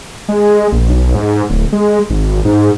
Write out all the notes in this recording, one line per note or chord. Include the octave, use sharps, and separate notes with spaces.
G#3
A#1
B1
G#2
D1
G#3
G#1
G#2